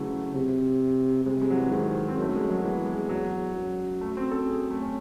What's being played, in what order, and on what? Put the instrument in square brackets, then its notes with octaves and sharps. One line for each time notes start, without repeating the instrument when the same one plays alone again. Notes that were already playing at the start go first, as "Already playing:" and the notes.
Already playing: [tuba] C#3 [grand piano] E3 F#3 A3
[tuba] C3
[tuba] C3 [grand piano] G#3
[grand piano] G#3
F#3
E3
[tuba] G#2 [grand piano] D#3
[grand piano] C4
[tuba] F#2 [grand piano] A3
[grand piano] G#3
F#3
[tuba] E2 [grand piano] E3
[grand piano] G#3
F#3
[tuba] F#2
[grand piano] A3
C4
A4
G#4
A3
C#4